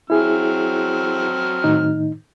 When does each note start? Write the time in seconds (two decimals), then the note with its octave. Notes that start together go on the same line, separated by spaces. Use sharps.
0.10 F#3 C4 E4 G#4 F6
1.64 A2 D#3 D#4